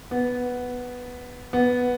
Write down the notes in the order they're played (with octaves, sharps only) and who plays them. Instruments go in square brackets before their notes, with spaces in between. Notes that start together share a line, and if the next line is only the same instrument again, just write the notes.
[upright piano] B3
B3